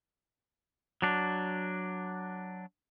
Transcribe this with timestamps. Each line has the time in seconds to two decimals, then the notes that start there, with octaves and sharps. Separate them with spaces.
1.02 F#3 D4